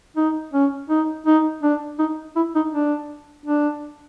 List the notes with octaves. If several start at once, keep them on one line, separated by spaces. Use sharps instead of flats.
D#4
C#4
D#4
D#4
D4
D#4
E4
D#4
D4
D4